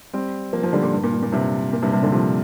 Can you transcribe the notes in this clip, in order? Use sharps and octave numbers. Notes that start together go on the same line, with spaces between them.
G3 C4
F3 A#3
F3 A#3
D3 G3
A#2
G2
A#2
G2
A#2
G2 C3
A#2
G2 C3
G2 C3
A#2 D3
C3 F3